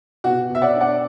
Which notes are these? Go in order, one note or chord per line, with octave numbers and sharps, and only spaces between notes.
B2 F#4
B2
E5
D5 F#5
D4
D5 F#5